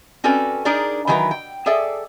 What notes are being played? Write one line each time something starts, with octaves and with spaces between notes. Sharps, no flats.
C4 C#4 F#4 A4 B4 D5
D4 D#4 G#4 A#4 D5
D#3 E3 F#3 G4 A#4 B4
G5
G#4 A4 D5 E5